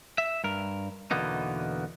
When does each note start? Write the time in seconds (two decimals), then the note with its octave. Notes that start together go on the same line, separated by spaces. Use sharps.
0.18 E5
0.44 G2 A#4
1.11 E2 B2 D3 A#3 B3 D#4